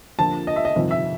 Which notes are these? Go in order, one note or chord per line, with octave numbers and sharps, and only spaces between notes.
F2 D3 F3 A#3 A5
D#5
E5
D#5
G1 F2 C3 D#3
E5